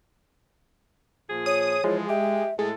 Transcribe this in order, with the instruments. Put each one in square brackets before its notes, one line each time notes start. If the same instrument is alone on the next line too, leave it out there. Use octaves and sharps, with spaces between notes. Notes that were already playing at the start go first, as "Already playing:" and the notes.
[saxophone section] A#2 F3 G#4
[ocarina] C#5 [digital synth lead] D#6
[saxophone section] E3 F3 [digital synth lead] G#3
[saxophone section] G4 [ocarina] E5
[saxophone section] A2 A4 [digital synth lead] G#3